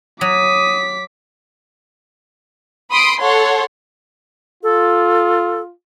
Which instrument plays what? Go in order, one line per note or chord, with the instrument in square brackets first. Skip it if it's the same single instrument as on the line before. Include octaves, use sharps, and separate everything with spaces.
[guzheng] F#3 [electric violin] D6 B6 [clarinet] D#6
[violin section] B5 C6 D#6 D7
A4 C#5 F#5 C6
[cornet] F4 [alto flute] A4